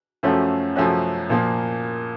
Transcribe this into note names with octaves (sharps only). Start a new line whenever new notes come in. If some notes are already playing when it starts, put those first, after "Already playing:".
F#2 F3 A3 C#4 F#4
F#2 F3 A3 C#4 F#4
A#2 F3 A#3